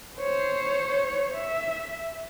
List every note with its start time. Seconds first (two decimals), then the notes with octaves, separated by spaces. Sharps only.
0.17 C5 C#5
1.35 E5